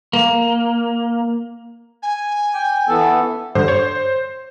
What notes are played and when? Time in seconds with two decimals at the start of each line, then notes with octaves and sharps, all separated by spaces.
0.13 A#3
2.03 G#5
2.55 G5
2.89 E3 B3 A4
3.55 G2 D3 C5
3.68 C#5